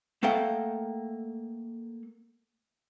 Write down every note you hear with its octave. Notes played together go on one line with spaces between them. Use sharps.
A3 A#3 A4 F#5 G5